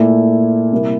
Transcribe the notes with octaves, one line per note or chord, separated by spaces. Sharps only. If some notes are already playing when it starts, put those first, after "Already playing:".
Already playing: A#2 A3 E4
C3 G3 A#3 E4